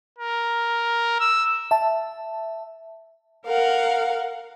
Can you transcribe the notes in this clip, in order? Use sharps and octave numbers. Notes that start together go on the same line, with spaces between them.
A#4
E6
E5 A5
A#4 F5 F#5